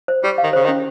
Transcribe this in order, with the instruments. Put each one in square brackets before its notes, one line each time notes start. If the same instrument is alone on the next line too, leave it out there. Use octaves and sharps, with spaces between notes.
[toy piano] C5
[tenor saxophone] G3 [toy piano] G4
[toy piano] F5
[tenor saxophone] D#3
[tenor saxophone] C#3 [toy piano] C5
[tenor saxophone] D#3
[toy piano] C#4